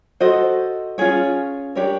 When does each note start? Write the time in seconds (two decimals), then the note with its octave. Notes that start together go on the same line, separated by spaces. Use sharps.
0.20 F#4 A4 C5 D#5
0.98 C#4 F4 G#4 C#5
1.75 D4 G4 A#4 C#5